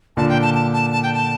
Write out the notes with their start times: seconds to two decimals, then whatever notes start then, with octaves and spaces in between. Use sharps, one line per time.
0.17 A#2 D3 A5
0.29 G5
0.42 A5
0.54 A5
0.73 A5
0.92 A5
1.03 G5
1.13 A5